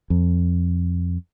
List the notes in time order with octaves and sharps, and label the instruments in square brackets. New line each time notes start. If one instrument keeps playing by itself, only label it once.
[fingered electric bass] F2